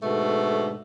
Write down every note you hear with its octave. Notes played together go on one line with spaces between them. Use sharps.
G#2 B2 D3 A3